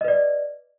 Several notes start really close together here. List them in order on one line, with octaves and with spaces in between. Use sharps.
D#5 B4 D5